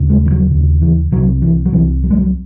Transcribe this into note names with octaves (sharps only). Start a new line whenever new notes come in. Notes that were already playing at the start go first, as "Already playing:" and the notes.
Already playing: D#2 C#3
G#3
E3
F#3
D#2 C#3
E3
C2 C3 F#3
E3
F#3
C2 C3 E3
F#3
G#3
F#3